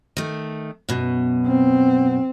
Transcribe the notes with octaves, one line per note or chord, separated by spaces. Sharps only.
D#3 A3
F#2 B2
C4